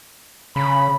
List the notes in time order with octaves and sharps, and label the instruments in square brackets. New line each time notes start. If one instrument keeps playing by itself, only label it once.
[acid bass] C#3 [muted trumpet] B5